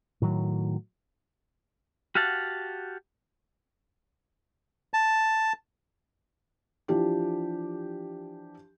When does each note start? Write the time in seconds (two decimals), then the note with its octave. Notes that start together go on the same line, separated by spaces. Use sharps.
0.22 A2 D#3 F#3
2.15 F#4 G4 F5 F#5 A5
4.94 A5
6.88 E3 F3 D4 G4